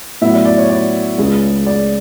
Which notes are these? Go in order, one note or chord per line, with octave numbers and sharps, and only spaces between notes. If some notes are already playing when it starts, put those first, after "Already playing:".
A2 F#3 B3 E4 E5
D5
D5
C#5
D5
C#2 C#3 G#3
D5